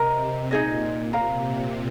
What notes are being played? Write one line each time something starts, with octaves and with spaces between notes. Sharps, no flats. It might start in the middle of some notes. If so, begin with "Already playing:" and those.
Already playing: C3 A#4 D#5 A#5
C3
A#2 D#4 G#4 D#5
C3 A#4 F5 A#5
A#2